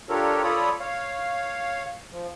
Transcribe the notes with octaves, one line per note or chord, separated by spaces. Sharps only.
D4 F4 G4 A4 A#4 C#5
F4 A4 C#5 D5 B5 D#6
C#5 F5
F3